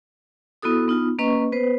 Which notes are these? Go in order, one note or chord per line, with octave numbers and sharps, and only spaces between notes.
B3 E4 F#4 A4 D#6
B3 D#4 F4
A#3 C#4 B4 D#5 C#6
B3 B4 C5